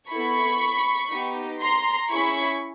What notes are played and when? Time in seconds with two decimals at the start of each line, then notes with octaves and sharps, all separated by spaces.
0.11 B3 E4 A4 B5 C#6
1.12 B3 D#4 G4
1.61 A#5 C6
2.11 C#4 E4 G#4 B5 C#6